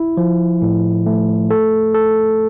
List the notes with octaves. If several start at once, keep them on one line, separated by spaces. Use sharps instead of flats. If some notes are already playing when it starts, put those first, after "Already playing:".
Already playing: E4
F3
A2
A3
A4
A4